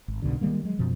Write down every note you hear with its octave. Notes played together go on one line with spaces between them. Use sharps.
G#1
C2 G#2 B2 D3
D#3 G3 G#3 A#3
F#3 G#3
F#2 B2 F3